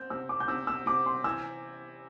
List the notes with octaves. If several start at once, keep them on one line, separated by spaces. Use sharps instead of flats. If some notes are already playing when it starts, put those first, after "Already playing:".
Already playing: C4 G6
C3 E6
D6
G6
C3 E6
E6
C3 D6
C6
E3 E6